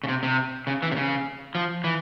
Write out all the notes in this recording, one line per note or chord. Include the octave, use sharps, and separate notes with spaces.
C#3
C3
C3
C#3
E3
C3
C#3
F3
E3